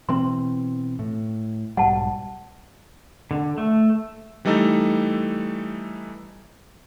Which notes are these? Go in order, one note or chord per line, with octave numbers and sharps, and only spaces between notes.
B2 E3 C4 C6
A2
B1 G#2 G3 F#5 A5
D3
A3
E3 G3 A3 D#4 A4